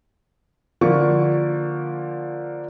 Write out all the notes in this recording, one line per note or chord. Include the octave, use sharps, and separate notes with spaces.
D3 F3 A#3 C#6